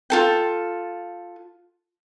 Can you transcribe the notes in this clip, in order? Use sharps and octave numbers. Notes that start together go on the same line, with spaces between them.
F4 A4 G5